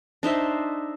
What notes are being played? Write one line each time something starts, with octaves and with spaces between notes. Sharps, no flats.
D4 D#4 C5 E5